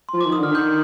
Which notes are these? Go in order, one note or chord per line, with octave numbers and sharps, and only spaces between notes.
F3 C6
D6
D#3
D#6
D3 F6
D#3 G6